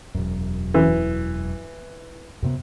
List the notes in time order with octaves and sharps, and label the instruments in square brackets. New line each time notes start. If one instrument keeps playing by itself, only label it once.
[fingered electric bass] E1 F#2
[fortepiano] E3
[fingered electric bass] F#2 C3 B3